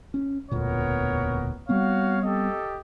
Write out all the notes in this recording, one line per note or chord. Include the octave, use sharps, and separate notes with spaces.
C#4
E1 D2 A#2 B3 A#4 C#5
G3 B3 C4 F#4 C#5 F5
G4 A4 D#5